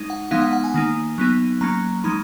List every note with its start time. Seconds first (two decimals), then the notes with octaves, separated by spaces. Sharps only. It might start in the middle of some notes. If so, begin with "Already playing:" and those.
Already playing: G#3 D#4
0.10 F#5
0.31 F3 G#3 B3 D#4 F5
0.42 F#5
0.53 F#5
0.64 G#5
0.74 D#3 A#3 D#4
1.18 F#3 B3 D#4
1.61 F#3 A#3 C#4 A#5
2.04 F3 G#3 D#4 B5